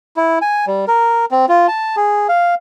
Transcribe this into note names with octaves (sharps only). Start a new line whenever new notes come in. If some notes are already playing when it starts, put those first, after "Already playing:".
E4
G#5
G3
A#4
C4
F4
A5
G#4
F5